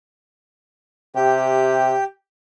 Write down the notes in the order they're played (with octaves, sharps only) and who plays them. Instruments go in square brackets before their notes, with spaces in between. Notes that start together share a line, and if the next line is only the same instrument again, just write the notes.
[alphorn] C3 [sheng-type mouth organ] G4 G5